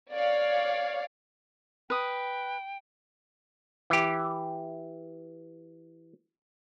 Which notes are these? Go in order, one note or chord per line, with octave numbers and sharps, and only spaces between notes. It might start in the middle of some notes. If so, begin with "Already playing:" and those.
C#5 D5 F5
B4 G5 D#6
E3 G4